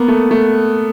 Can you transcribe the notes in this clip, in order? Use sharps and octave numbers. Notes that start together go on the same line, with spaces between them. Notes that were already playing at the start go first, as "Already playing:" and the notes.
Already playing: A#3 B3
A3
A3